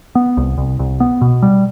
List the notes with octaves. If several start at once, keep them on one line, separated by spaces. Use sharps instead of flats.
B3
C2
C2
C2
B3
B2
G3